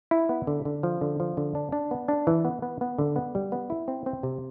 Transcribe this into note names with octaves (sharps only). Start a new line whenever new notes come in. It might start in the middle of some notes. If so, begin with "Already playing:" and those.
E4
B3
D3
D3
F3
D3
F3
D3
D4
D4
B3
D4
E3
B3
B3
B3
D3
B3
G3
B3
E4
C4
C4
C3